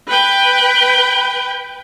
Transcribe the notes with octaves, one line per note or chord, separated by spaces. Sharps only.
B4 G5